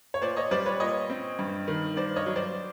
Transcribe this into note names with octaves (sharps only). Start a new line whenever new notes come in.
C#5
A#2 C5 D5
C#5 D#5
G3 C5 D5
B4 C#5
A#2 C#5 D#5
C4
G2
D#3
G2 C5 D5
C#5 D#5
F#3
C5 D5